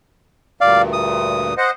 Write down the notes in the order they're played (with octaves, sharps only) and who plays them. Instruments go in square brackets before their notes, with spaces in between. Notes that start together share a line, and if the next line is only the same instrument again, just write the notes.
[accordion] D2 G2 A#2 [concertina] D5 F5
[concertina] D#6
[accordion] C5 D#5 F#5